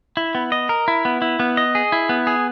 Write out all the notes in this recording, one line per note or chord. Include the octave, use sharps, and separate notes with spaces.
E4
B3
D#5
A#4
E4
B3
E4
B3
D#5
G#4
E4
B3
G#4